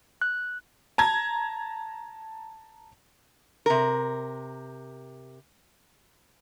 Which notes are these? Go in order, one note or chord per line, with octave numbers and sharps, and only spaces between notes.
F#6
A5 A#5 G#6
C3 A#4